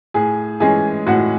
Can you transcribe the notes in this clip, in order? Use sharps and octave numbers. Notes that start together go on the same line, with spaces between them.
A2 G#4 G#5
E3 G#3 C#4 G#4 G#5
A2 F#4 F#5